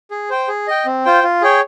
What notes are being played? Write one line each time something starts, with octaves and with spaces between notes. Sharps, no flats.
G#4
C5 G5
G#4
D#5 G5
C4
F4 C5 G5
F4
G#4 C#5 G5